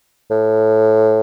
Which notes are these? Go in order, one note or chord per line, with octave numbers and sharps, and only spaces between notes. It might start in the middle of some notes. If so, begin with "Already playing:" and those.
A2